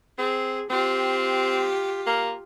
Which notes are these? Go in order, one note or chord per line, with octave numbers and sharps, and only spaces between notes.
C4 G#4
C4 F4 G4
A#3